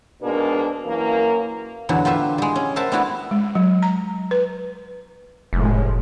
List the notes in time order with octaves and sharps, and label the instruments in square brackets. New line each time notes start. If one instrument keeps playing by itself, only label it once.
[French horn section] G#2 B2 G#3 A#3 D4
F#2 E3 A#3
[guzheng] E2 D3 F#3
F4 G4 B4 E5
G3 G#3
C#4
A#4 C5 E5 F#5 A5 B5
G3 A3 B3 D4 E4 F#4
[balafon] G#3
F#3
A#5
B4
[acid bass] F1 [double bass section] A2 F3 G#3